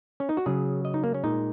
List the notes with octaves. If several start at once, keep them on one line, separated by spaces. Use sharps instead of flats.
C#4
D#4
F#4
C#3 F#3 G#4
D#5
D#4
A#3
C#4
A#2 G#3 D#4